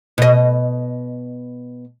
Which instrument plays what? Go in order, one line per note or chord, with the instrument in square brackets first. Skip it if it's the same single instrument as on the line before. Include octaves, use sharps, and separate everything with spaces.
[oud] B2 D#5